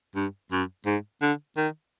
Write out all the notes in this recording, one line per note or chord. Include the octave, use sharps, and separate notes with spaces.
G2
F#2
G#2
D3
D#3